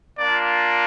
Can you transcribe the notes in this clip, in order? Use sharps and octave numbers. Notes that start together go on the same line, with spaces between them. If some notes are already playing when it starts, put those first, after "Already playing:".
A#3 D4 F4 D5